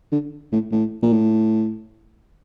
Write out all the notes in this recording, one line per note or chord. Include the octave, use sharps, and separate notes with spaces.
D3
A2
A2
A#2
A2